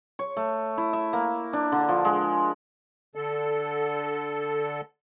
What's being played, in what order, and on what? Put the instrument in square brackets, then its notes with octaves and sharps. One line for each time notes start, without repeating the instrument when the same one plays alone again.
[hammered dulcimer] C#5
A3
E4
E5
A#3
D4
D3
F3
G#3
[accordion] D3 A4